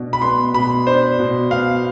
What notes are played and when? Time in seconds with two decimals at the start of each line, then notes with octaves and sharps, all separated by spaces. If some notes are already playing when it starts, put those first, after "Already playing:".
Already playing: B2 D4
0.13 B5
0.22 B3 C6
0.54 B2 B5
0.87 D4 C5
1.19 B2
1.51 B3 F5